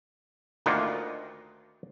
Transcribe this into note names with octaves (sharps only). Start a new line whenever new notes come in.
D2 D#3 A#3 D4 F4 F#5